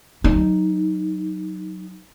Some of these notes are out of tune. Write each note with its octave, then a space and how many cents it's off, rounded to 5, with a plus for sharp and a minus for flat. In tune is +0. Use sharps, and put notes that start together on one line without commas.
F#3 +0 D#4 +0